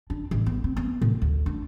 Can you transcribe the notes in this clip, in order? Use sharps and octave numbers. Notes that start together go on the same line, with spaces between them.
D4
A1
B3
C4
B3
A2
D2
D4